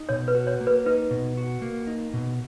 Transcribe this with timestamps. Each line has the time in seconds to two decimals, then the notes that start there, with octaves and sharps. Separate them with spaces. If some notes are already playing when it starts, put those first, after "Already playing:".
Already playing: D#4
0.09 B2 C#5
0.28 B4
0.35 F#4
0.47 C#5
0.61 A#3
0.67 B4
0.86 D#4 B4
1.11 B2
1.37 F#4
1.62 A#3
1.87 D#4
2.13 B2